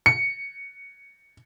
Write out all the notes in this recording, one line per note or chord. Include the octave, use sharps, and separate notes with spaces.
C#7